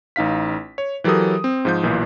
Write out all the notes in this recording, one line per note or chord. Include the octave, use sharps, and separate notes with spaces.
A1 D#4 F5 B6
C#5
E3 F#3 G4 A4 A#4 D#6
C4
G#2 F3 G6
B1 A#2 E3